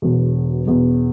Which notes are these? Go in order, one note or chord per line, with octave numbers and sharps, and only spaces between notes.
E1 E2 B2
E1 E2 B2